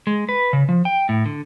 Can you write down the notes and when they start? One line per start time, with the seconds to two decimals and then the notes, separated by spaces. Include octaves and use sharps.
0.07 G#3
0.29 B4
0.53 C#3
0.69 F3
0.85 G5
1.09 A2
1.26 D3